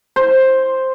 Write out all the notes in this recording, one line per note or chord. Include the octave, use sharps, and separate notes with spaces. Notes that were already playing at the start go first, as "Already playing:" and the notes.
C5